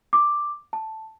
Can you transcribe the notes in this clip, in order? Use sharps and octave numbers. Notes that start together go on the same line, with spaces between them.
D6
A5